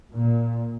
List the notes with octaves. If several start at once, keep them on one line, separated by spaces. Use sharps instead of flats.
A#2